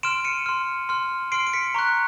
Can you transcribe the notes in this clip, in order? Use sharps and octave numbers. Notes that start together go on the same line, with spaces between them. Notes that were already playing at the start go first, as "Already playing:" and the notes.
C6 F6 D7 E7
C#7 D#7
C6 F6
C6 F6
C6 F6 C7 D7
D7
B6 C#7
A#5 C#6 F#6